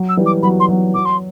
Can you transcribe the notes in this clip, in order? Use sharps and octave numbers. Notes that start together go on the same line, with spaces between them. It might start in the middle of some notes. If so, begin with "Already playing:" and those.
Already playing: F#3
E6
E3 G3
D6
F#3 B5
C6
F#3
F#3 D6
C6